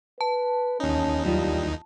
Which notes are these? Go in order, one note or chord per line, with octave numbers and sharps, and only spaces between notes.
B4 A5
D#2 C#4 D#4
F#3 G3 E4 F4